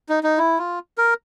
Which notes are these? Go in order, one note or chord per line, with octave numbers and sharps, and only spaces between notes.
D#4
D#4
E4
F4
A#4